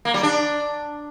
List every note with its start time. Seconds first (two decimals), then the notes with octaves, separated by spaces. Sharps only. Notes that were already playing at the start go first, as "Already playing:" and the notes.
0.05 A#3
0.14 G3
0.23 D4